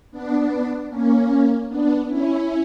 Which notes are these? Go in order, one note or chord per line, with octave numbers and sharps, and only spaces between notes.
B3 D4
A#3 C#4
B3 D4
C#4 E4